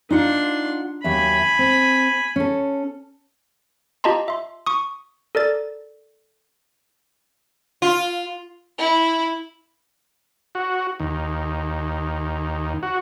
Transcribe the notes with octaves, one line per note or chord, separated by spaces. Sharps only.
D4 D#4 F4 F#5 C6
D#2 F#3 E5 G#5 B5
C4
C#4 A4
F4 G4 D#5 A5 A#5 C6
E5 C6
C#6 D#6
A4 A#4 D5 A6
F4
E4
F#4
D#2
F#4